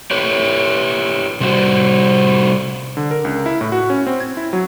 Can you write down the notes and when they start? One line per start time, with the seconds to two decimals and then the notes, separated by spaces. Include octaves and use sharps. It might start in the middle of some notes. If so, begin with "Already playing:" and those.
0.11 G4 B4 C#5
1.40 C3 G3 F#4 C5
2.97 D3
3.11 A#4
3.25 C#2
3.46 E4
3.61 A2
3.72 F#4
3.90 C#4
4.07 C4
4.20 G#6
4.37 E4
4.53 F#3